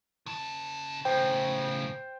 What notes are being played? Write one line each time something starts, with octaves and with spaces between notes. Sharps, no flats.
C#3 A5
A2 C#3 C5 G5